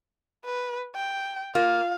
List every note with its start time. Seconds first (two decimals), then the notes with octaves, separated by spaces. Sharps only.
0.45 B4
0.95 G5
1.55 A#3 F4 F5